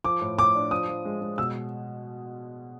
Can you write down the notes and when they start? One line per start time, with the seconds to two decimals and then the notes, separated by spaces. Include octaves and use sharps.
0.04 F3 D6
0.21 A2
0.38 A2 D6
0.55 D4
0.71 F3 D#6
0.88 F3
1.05 G#3
1.21 G#3
1.38 B2 E6